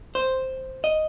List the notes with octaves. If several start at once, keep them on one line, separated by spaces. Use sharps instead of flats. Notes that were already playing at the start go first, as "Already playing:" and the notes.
C5
D#5